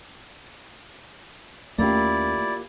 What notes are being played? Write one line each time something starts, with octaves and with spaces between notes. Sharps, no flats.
D#2 A3 A#3 C#4 E4 F4 G4 D5